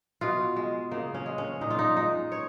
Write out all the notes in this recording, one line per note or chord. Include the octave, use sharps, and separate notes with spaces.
B2 F4
G#3
C#3 A#3
C#4
G#3
C#4
A#2 D#4
F4
D#4
G#3 D#4
C#5